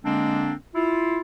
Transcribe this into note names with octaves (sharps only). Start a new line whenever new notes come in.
D3 G#3 A#3 C4 D4
E4 F4